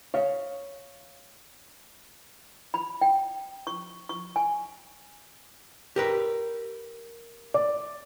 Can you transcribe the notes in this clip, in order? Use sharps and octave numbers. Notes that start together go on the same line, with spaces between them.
C#5 F5
B5
G5
C#6
C#6
G#5
G4 A#4 B4
D5